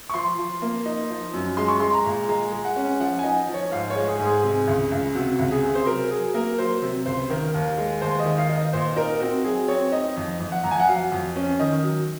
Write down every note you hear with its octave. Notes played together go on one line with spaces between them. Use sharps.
C#6
F3 C6
F3
A#3
D#4
F3
F#2
G#3 C6
C#6
G#3 C6
A#5
A#2
G#3 A#5
G#3
F#5
C#4
F3 F#5
D#4 G#5
F3
C#5
G#2 F5
C#5
G#3
G#4
G#2
G#4
C3 G#4
C#2
C#2
C3 F#4
C#2
G#4
C3
C5
F#3 A#4
F#3 G#4
A#3 A#4
F#3 C5
C3
C#2 C5
D#3 A#4
D#2
G#3
D#2 C5
D#5
D#3
F5
D#4
D#5
A#2 C5
D#4 A#4
C4 F#4
F#3 G#4
C4 C#5
D#4 D#5
F2
F2
F#5
F2 A#5
G#5
F#5
F#3 F5
F2
C#4
D#3 D#5
F#3